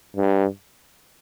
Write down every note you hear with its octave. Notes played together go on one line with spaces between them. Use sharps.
G2